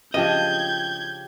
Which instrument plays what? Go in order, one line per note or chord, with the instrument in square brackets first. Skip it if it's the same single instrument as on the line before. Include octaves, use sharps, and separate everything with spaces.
[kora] C#3 F3 D4 [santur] G4 F5 [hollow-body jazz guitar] D#5 [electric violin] G6 G#6